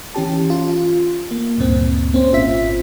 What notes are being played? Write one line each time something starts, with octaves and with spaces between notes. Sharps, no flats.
E3 C#4 G4 A5
F4
A#3
D2 G2 A#2 C4
A#3 C4 C#4 C5
G#1 F4 E5 B6